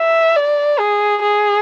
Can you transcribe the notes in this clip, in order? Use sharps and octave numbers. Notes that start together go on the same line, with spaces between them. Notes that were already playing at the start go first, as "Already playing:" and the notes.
Already playing: E5
D5
G#4
G#4